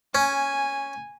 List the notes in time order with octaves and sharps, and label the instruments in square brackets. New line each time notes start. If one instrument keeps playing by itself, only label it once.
[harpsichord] C#4 [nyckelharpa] G#5